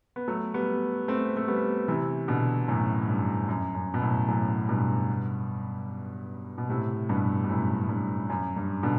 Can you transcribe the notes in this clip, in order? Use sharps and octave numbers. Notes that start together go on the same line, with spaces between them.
B3
F#3 A3
G3 B3
A3 C4
A3
G3 B3
C3 E3
B2 D3
F#2 A2
G2
F#2
F#2
B2
F#2 A2
F#2 A2
G2 B2
B2
A2 C3
G2 B2
B2
F#2 A2
G2
F#2
G2
B2 D3